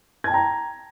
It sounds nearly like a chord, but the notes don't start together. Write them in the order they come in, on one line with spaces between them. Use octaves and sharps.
G#6 A5 G5 A#5